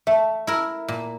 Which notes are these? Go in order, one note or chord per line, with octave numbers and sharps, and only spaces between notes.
A3 E5
E4 A#4
A#2